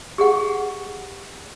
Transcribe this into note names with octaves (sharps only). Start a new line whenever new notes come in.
G4 G#4 F#5